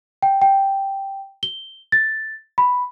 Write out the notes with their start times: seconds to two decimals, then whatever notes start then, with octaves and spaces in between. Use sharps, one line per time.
0.22 G5
0.42 G5
1.43 G7
1.92 A6
2.58 B5